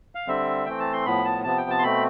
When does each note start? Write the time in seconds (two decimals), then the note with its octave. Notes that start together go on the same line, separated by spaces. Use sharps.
0.15 F5
0.28 D3 G3 C4 E5
0.66 E3 A3 C4 G5
0.79 A5
0.93 C6
1.06 A2 F3 B3 B5
1.25 A5
1.44 C3 F3 B3 A5
1.58 G5
1.70 A5
1.79 C6
1.82 B2 A3 C4 B5